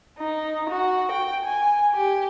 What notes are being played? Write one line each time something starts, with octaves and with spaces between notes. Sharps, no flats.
D#4
F#4
G5
G#5
G4